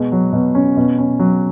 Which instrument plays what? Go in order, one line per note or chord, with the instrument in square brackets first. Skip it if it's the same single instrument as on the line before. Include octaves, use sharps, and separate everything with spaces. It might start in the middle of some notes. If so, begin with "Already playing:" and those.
Already playing: [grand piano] B2 G#3
F#3
B2
C#4
B2
C#4
F#3